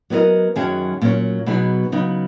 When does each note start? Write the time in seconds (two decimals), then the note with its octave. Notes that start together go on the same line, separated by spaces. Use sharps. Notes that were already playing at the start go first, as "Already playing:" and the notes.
0.10 F#3 B3 E4 A#4 D#5
0.56 F#2 D#3 F#3 C#4 G#4
1.02 A#2 F#3 C#4 F#4 C#5
1.46 B2 F#3 B3 D#4 G#4
1.92 C#3 F#3 B3 D#4